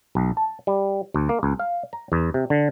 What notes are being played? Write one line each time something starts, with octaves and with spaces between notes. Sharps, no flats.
B1
A5
G3
D2
A#3
C#2
F5
A#5
E2
C3
D3